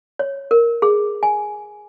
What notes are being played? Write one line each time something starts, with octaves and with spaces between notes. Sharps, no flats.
C#5
A#4
G#4
G#5